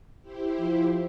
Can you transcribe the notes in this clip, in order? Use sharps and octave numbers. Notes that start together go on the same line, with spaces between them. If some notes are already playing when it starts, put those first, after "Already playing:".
E4 G4 C5
F3